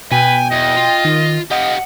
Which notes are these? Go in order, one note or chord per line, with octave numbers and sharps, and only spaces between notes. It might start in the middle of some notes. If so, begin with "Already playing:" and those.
B2 B4 G5 G#5
E2 D#5
F4
D#3
F4 G4 D#5 F#5